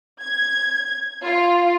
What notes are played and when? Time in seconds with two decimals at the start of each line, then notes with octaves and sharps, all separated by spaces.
0.21 G#6
1.25 F4